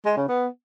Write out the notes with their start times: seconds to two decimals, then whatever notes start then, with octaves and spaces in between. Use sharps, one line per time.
0.05 G#3
0.17 C#3
0.29 B3